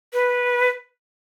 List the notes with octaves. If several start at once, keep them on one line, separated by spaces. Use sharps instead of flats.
B4